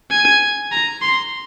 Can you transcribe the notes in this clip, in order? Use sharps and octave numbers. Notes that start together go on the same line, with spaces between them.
G#5
A#5
C6